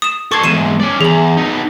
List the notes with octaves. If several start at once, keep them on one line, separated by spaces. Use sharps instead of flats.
D#6 E7
A4 C5 C#6 D6 G#6
E2 G#2 C7 D#7 E7
C#4 D5
E2 G#4 F#7
B3 D#4